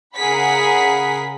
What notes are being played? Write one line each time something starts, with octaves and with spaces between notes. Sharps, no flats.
C#3 G#4 A#4 F#5 B5 B6